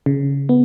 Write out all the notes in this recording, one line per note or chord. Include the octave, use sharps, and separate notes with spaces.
C#3
B3